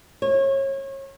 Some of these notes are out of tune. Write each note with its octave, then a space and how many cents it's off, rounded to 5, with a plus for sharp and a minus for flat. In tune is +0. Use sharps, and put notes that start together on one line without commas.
C#5 -30